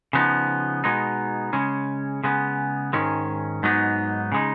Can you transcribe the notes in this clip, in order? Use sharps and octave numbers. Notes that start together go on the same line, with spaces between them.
C#3 F3 B3 D#4
B2 G#3 B3 D#4
C#3 G#3 C#4
C#3 G#3 B3
G#2 D#3 G#3 C#4
G#2 F#3 B3 D#4
C#3 G#3 D#4